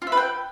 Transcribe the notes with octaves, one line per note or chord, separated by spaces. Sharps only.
F4
E5
B4
G5